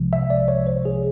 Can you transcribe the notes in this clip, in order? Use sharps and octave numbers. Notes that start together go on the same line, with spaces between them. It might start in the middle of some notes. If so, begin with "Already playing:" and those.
Already playing: C2 C3 F3 G#3
E5
D5
C#5
C5
G#4